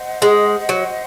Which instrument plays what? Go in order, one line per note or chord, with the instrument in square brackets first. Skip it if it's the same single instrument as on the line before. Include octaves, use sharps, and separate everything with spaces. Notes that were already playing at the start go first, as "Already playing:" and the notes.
Already playing: [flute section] C5 D#5 F#5
[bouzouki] G#3
F#3